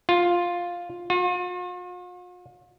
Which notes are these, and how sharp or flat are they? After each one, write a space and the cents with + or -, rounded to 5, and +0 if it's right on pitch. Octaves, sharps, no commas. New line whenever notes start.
F4 +5
F4 +45